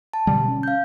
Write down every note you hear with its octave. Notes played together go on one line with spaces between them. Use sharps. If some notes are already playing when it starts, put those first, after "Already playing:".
A5
B2 D3 G3
C#4
F5 G6